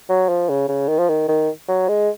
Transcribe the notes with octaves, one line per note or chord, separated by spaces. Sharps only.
F#3
F3
C#3
C#3
D#3
F3
D#3
D#3
F#3
G#3